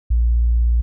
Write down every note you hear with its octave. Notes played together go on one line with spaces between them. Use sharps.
A#1